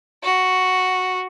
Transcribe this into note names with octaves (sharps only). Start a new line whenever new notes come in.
F#4